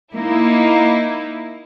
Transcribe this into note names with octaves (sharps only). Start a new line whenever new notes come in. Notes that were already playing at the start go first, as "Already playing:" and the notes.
A#3 D#4 E4